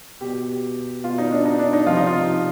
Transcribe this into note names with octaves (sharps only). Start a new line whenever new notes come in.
B2 G4
B2 F4
D#4
D4
D#4
D4
D#4
C3 F3 F4
D#4
F4